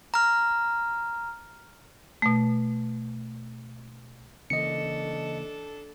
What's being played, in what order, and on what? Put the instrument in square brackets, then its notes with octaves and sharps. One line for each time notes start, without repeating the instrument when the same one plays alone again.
[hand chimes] A#5 F6
[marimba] B2 A3
[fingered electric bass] C#3 E3 A#3 [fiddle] D4 A4 [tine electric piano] D#5 C#7